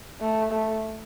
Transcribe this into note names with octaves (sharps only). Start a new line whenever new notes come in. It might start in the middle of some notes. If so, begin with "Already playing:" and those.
A3
A3